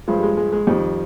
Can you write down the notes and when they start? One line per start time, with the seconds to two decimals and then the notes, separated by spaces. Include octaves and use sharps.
0.07 G2 F3 G#3
0.19 G3
0.23 G#3
0.37 G#3
0.52 G#3
0.67 F2 D#3 G3